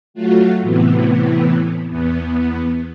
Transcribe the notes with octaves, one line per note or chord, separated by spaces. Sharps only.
F#3 A3 F4 F#4
A2 C3 E3 B3
E2 B3